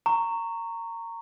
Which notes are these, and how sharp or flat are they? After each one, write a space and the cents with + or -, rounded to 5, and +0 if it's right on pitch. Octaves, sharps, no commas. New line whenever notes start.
A#5 -20 C#6 +0